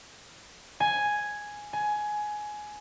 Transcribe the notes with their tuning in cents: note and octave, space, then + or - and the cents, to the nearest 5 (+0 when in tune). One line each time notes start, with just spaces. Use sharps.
G#5 +0
G#5 +15